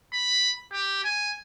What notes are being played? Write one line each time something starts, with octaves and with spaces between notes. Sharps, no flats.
B5
G4
G#5